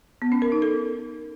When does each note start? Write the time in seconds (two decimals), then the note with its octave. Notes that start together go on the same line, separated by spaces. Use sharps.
0.22 B3
0.32 C#4
0.42 A#4
0.52 D#4
0.62 A4